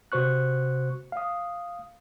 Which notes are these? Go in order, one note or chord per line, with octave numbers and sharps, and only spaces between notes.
C3 F#4 C5 C#6 F#6
F5 D#6